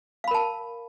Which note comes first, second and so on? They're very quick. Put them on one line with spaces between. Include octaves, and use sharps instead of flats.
F5 B5 A#4 A5